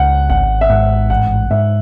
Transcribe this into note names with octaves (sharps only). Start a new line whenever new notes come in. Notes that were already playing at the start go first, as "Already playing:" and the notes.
Already playing: C#2 F#5
G#1 F#5
E5
G#2 F#5
A1 F#5
G#2 E5